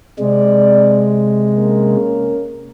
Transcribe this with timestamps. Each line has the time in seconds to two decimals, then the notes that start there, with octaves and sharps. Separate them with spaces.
0.19 C3 G#3 C4 D5
1.57 A#3 C#4 A#4